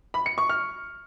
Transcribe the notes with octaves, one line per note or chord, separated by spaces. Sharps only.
B5
C#7
C#6
F6